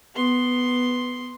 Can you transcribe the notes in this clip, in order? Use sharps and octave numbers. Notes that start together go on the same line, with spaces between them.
B3 C6